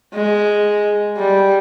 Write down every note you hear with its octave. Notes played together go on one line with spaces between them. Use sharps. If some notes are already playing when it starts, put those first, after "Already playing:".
G#3
G3